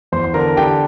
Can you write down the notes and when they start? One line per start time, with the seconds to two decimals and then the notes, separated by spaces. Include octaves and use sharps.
0.12 E2 C5 C6
0.24 C6
0.34 D3 A#4 A#5
0.57 D3 G4 G5